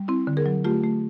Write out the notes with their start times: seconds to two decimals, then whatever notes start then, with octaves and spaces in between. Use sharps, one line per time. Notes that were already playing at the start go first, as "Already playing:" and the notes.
Already playing: G3
0.08 C4 E4
0.27 D3
0.37 G#4 A#4
0.46 F#3
0.65 A3 F4 G4
0.84 A3